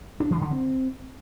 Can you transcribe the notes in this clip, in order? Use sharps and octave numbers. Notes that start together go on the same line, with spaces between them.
D4
E3
D3
C4